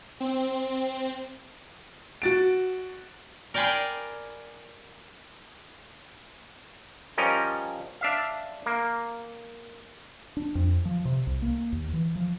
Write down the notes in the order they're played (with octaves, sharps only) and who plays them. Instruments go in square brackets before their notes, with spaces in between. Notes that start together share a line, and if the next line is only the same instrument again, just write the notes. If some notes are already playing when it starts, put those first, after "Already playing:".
[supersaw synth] C4
[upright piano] F#4 A6 D7
[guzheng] A#4 D5 G5 G#5 B5 C6
[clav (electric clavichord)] F3 G3 C#4 A#4 D#5
D4 E5 F5
A#3
[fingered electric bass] D4
F2
F3
C3
C2
A#3
D#2
E3
F3